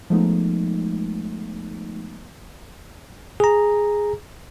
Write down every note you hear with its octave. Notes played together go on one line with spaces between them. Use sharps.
F3 G#3 A3 B3 D#4
G#4 A#5